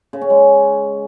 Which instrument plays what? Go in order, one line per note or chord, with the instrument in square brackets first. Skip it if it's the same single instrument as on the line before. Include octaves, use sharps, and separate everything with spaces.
[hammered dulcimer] C#3
C#4
G#3